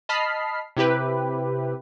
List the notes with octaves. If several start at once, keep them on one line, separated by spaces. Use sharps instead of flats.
D#5 A5 B5 F6 B6 C7
C3 E4 G4 B4